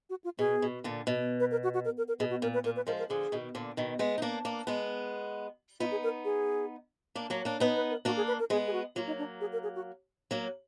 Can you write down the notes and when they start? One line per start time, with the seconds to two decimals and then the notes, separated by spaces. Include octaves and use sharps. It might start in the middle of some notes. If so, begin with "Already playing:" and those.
0.10 F#4
0.24 F4
0.39 B2 G#4
0.62 B2
0.84 A#2 D3
1.07 B2
1.40 B4
1.51 A#4
1.63 F#4
1.74 F#4
1.85 A#4
1.98 A#4
2.08 A#4
2.20 B2 G#4
2.30 F#4
2.42 A#2 A#4
2.54 B4
2.64 A#2 A#4
2.76 B4
2.87 F3 G#3 A#4
2.99 A#4
3.09 D3 F3 G#4
3.32 B2 D#3
3.55 A#2 D3
3.77 B2 D#3
3.99 G#3 B3
4.18 D#4
4.22 A#3 D4
4.45 A#3 D4
4.67 G#3 B3
5.80 B3 D#4 F4
5.91 G#4
6.03 A#4
6.25 G#4
7.15 A#3 D4
7.30 F#3 A#3
7.45 A#3 D4
7.60 B3 D#4 B4
7.76 B4
7.91 A#4
8.05 A#3 D4 F#4
8.17 G#4
8.28 B4
8.39 A#4
8.50 G#3 B3 G#4
8.67 G#4
8.73 F#4
8.96 F#3 A#3 F4
9.07 D#4
9.18 D4
9.41 G#4
9.53 A#4
9.63 G#4
9.75 F#4
10.31 F#3 A#3